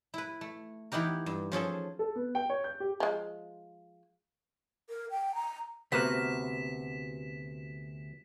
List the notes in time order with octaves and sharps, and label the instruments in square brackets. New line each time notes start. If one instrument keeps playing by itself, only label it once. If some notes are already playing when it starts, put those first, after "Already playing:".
[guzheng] E4 B4
A3
E3 B3 D#4 G4 A#4
G2
F3 C#4 G#4 A4
[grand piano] A4
B3
G5
C#5
G6
G4
[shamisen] F3 G#3
[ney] A#4
G5
A#5
[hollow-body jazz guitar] D2 C3 [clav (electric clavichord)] B3 F#4 A#4 [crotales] B6 E7